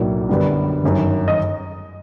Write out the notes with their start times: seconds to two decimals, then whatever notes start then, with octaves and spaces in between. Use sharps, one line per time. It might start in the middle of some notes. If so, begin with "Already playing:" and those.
Already playing: B1 A2 F#3 A#3 D4
0.29 F#2 D3 G3 B3
0.84 G1 F#2 D#3
1.28 D#5